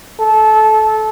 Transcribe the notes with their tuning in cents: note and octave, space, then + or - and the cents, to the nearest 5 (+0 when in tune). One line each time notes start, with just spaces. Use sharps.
A4 -20